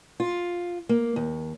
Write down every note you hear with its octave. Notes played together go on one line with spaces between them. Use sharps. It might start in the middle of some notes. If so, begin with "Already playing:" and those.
F4
A#3
D#2